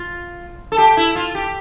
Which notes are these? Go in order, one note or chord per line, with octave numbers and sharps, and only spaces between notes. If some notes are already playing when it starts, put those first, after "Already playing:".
Already playing: F4
A4
G4
E4
F4
G4